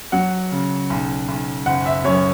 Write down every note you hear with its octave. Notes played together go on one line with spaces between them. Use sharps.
F#3 F#5
C#3
B1
B1
F#1 F#5
E5
F#2 C#5